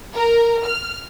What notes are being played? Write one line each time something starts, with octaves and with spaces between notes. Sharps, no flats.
A#4
F6